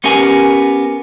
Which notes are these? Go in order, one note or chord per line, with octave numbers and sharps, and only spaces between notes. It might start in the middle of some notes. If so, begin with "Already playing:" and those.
B3 C#4 G4 A#4 G#5